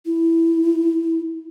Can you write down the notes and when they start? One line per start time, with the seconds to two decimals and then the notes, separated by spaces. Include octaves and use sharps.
0.06 E4